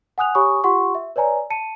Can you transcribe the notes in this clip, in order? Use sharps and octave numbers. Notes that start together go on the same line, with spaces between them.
F#5 G#5 D#6 F#6 F7
G4 C#5 G#5 B5 C#6 D#6
F4 G4 F#5 C6 C#6
E5
B4 C#5 D5 G#5 A#5
A5 C#7 D#7